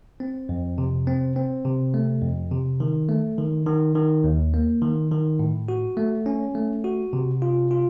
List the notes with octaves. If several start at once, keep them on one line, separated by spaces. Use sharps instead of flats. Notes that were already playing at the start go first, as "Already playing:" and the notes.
C4
F2
C3
C4
C4
C3
A3
F2
C3
D#3
A3
D#3
D#3
D#3
D#2
A#3
D#3
D#3
A2
F#4
A3
C#4
A3
F#4
C3
F4
F4